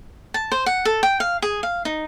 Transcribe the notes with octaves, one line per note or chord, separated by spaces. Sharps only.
A5
C5
F#5
A4
G5
F5
G#4
F5
D#4